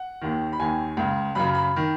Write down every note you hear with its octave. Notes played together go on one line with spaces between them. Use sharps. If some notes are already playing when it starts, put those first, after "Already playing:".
Already playing: F#5
D#2 D#3
B5
D#2 D#3 G#5
C#2 C#3
F#2 C#3 B5
B5
D#3